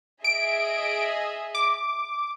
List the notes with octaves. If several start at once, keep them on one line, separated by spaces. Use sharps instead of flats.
G#4 D#5 E5 D7
D6